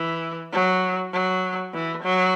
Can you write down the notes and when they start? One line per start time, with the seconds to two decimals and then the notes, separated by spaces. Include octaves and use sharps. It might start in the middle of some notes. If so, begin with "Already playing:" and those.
Already playing: E3
0.53 F#3
1.13 F#3
1.74 E3
2.04 F#3